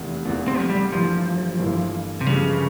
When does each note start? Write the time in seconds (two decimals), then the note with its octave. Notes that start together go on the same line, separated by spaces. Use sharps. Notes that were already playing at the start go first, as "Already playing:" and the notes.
Already playing: F1 E2 C3 E3 A#3
0.25 F1 E2 C3 E3 A#3
0.48 C4
0.60 F3
0.70 G3
0.92 G1 G2 E3 F3 A#3 E4
1.60 G1 G2 E3 A#3 E4
2.21 C3
2.26 G1 G2 C#3 F3 G#3